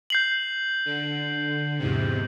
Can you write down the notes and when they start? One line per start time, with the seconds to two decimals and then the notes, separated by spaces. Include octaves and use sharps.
0.10 G6 C7 F#7
0.85 D3
1.79 E2 G#2 C3